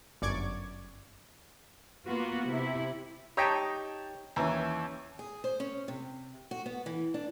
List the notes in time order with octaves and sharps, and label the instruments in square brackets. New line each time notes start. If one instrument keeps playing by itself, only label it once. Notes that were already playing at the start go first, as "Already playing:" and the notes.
[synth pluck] G1 F#2 D5 C#6 D6 G#6
[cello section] A#3 B3 F4 F#4
C3 E4
[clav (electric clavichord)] D#4 G4 [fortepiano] C#5 G5 A5
[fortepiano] D#2 E3 C#4 [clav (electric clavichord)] A#5
[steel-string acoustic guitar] G#4
C5
C#4
C3
F#4
B3
E3
D4